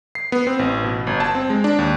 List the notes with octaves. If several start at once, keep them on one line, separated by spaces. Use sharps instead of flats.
C7
B3
C4
A1
B2
G1
A5
C4
G#3
D4
D#2